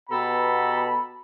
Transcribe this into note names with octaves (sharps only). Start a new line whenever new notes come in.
B2 B3 G4 A4 A#5 B5